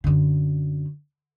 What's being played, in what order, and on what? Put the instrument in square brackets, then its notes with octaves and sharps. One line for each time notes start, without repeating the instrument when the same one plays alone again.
[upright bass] F#2 D3